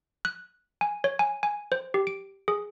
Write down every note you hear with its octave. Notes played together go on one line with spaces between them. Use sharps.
F#6
G#5
C#5
G#5
G#5
C5
G4
D7
G#4